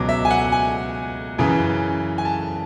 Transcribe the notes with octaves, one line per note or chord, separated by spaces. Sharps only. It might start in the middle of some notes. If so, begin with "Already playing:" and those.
Already playing: C#2 B2 F#3 D6
E5
G#5
F#5
G#5
F#2 C#3 E3
G#5
A5